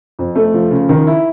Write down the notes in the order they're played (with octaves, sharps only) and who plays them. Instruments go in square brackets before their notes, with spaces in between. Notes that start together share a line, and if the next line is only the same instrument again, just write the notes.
[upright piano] F2
A3
F3
C#3
D#3
E4